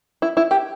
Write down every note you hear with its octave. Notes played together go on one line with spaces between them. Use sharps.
E4
E4
G4